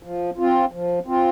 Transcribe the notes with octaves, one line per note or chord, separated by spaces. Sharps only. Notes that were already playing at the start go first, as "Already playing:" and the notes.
F3
C4 F4
F3
C4 F4